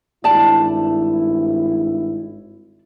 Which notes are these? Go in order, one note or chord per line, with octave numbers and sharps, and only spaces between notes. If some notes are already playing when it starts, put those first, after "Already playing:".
G#1 G2 E4 D5 A5